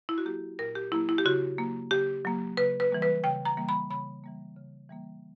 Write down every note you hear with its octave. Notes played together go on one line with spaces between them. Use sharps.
E4
F#4
F#3 A#3 G4
A#2 A#4
G4
F#3 A#3 E4
E4
G4
C#3 F#4
F#3 A#3
C#3 G4
F#3 A#3
C#3 B4
B4
E3 G3 A#3
B4
C#3 G5
A#5
E3 G3 A#3
B5
C#3 B5
E3 G3 A#3
C#3
E3 G3 A#3